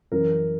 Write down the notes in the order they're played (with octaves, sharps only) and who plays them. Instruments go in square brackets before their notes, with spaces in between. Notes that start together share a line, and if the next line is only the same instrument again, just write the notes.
[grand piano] F#2 E3 A#4